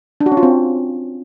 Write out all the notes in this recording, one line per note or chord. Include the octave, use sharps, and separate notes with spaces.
D4
F#4
C#4
F4
C4